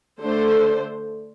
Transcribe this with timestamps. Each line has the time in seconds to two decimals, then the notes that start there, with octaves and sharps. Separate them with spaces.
0.21 D3 A3 D4 A4 C5